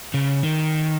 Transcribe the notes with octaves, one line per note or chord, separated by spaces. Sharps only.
C#3
D#3